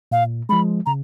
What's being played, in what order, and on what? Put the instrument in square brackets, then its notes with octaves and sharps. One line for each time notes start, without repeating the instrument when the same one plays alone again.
[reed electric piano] A#2 [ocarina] F5
[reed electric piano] F3 G#3 [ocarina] B5
[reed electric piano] C#3 [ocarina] A#5